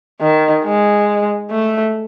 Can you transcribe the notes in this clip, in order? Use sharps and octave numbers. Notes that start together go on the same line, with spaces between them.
D#3
G#3
A3